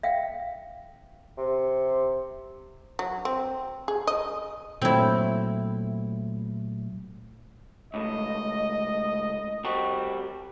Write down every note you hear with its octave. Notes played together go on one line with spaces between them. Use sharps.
E5 F5 G5
C3
F#3
C4
G#4
D#5
A#2 F#3 A3 C4 E4
C#2 A2 D#5
G3 C4 F#4